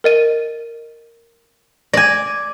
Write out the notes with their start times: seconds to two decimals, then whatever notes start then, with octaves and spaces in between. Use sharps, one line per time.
0.04 A#4 D#5 D#7
1.94 D5 G#5 A#6